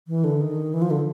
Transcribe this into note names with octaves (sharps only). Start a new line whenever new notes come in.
E3
D3
D#3
E3
F3
D3